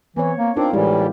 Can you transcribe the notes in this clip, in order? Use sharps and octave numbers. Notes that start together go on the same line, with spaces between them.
E3 B3 C4 C#5
A#3
C4 D4 D#4 F4 A#4
A2 E3 G3 G#3 E4 G4